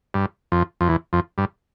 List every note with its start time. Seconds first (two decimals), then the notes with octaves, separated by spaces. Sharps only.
0.14 G2
0.52 F2
0.81 F2
0.89 E2
1.13 F2
1.38 G2